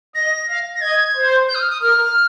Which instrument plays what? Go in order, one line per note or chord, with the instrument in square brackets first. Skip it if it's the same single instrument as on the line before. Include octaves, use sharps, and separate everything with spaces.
[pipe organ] D#5 [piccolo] A#6
[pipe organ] F5
[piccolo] A#6
[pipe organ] D#5 [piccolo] G#6
[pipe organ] C5
[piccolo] G6
D#6
F6
D#6
[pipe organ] A#4 [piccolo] F6